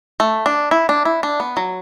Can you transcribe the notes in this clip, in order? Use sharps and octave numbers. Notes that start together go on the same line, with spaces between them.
A3
D4
E4
D4
E4
D4
B3
F#3